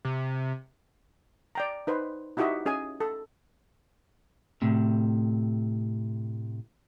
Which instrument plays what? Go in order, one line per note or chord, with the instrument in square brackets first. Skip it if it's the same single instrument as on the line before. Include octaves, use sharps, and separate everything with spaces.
[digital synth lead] C3
[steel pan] D5 G5 A#5
D#4 B4 C5
D#4 E4 F#4 G4 D#5 E5
C#4 G#4 D#5 G#5
A4
[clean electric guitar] A2 C3